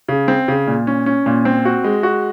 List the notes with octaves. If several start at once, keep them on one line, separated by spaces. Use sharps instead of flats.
C#3
C4
C#3
A#2
C#4
C#4
A#2
C4
F#4
G#3
F#4